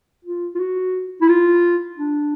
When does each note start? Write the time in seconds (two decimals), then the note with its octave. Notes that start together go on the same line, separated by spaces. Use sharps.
0.25 F4
0.55 F4
0.60 F#4
1.21 E4
1.29 F4
1.98 D4